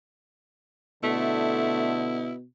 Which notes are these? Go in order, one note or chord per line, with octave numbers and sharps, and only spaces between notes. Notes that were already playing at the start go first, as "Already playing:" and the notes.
B2 D3 A3 E4